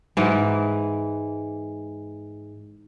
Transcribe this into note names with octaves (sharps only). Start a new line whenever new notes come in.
G#2 E3